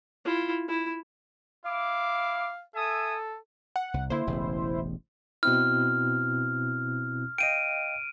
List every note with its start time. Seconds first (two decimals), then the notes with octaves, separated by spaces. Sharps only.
0.25 E4 F4
0.68 E4
1.65 E4 F5 D6
2.75 A4 E5 G#5 D#6
3.76 F#5
3.94 C2
4.10 D3 A#3 E4 C5
4.27 E1 A1 C#3
5.43 B2 C4 E4 F6
7.38 D#5 F5 G5 D7 D#7